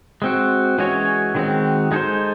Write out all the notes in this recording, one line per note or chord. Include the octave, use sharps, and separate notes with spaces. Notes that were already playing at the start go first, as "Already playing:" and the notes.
G#3 C4 F#4
E3 G#3 C#4 F#4 C#5
D#3 G#3 C4 F#4
G#3 D#4 A4 C5